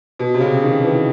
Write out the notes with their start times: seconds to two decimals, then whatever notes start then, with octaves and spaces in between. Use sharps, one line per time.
0.19 B2
0.34 C3
0.40 C#3
0.63 D#3
0.84 E3